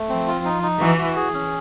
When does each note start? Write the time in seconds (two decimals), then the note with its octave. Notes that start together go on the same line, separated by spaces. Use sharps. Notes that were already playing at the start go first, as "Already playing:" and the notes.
Already playing: A3
0.09 F3 C4
0.27 F4
0.45 D#4
0.63 D#4
0.81 E3 F#4
0.98 F#4
1.16 G#4
1.34 C#4